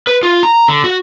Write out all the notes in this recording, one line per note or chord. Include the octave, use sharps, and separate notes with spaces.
B4
F4
A#5
D3
F#4